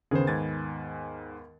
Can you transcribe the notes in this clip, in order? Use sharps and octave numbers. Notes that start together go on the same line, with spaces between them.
D#2 C#3 B3 G#4 C5
G#2 G#5 G#6 A6